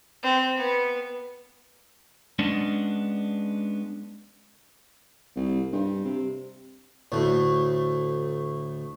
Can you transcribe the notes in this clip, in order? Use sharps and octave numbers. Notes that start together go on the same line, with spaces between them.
C4
B3
G#3 B3 C#4 D4
C2
G2
C3
D2 A2